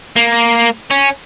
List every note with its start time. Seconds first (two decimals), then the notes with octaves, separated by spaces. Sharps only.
0.16 A#3
0.91 C#4